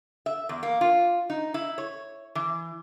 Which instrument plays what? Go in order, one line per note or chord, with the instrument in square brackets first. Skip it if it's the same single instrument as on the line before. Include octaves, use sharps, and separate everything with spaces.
[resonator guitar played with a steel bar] E5
E2
A#3
F4
D#4
E4
C#5
E3